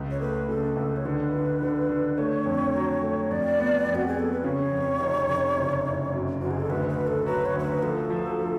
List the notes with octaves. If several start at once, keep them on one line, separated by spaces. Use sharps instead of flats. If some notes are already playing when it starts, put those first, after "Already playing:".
Already playing: C#2
C#5
A3 B4
C#3 A4
C#2
C#5
D3 B4
D3
D3
D3
A3 C#5
F2
F#3
A3
F2 D5
B3
F2
F#4
G#4
B3 A4
B4
C#3 C#5
F2
F1
F1
F#1
F#1
F#2
F#1 F#4
G#4
A4
D2 B4
B4
D2
A4
F#3 B4
C#5
D2
C#5
B4
F3 A4
F3
F3